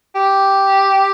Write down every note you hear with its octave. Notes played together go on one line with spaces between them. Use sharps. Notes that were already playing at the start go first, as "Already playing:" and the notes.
G4